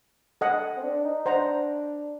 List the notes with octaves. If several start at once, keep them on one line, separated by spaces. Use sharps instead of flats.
A4 D#5 F#5
C4
D4
D#4
D4 C5 F#5 A#5